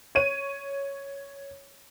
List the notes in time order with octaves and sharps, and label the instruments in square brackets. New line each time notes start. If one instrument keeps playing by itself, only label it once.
[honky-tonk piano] C#5 D#7